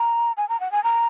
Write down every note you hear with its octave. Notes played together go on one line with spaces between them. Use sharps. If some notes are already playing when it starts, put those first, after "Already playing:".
Already playing: A#5
G#5
A#5
F#5
G#5
A#5